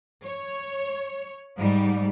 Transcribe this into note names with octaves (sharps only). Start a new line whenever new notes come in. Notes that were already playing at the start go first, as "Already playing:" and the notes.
C#5
G#2 G3